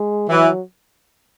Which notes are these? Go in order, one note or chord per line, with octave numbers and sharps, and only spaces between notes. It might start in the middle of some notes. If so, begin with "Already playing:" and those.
Already playing: G#3
E3 F#3